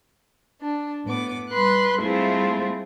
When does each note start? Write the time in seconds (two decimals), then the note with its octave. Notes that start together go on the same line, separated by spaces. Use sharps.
0.60 D4
1.04 A2 B3 D6
1.50 G3 B4 C6 F#6
2.00 G3 A3 C4 E4 F4 G#4